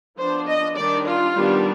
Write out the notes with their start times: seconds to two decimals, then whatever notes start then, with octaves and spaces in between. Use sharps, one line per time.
0.18 F3 B3 D4 C5
0.46 D#5
0.76 D#3 G3 D4 D5
1.05 F4
1.34 D#3 G3 B3 D4